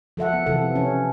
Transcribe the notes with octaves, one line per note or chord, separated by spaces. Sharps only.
F3 A4 E5 F#5
B3
C3 E3 A4
C#4